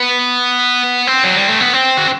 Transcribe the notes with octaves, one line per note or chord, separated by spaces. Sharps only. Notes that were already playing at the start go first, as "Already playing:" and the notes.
Already playing: B3
C4
F#3
G3
A3
B3
C4
F#4